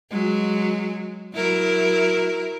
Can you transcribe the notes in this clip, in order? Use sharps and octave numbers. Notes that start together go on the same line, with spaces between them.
F#3 G#3
F#3 E4 A#4